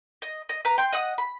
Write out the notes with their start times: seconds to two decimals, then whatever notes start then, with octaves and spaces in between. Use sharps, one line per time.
0.22 D#5
0.49 D#5
0.65 B4 A#5
0.78 G5 C6
0.93 D#5 F#5 D#6
1.18 B5